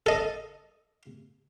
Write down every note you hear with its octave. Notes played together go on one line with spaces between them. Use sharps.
A4 D#5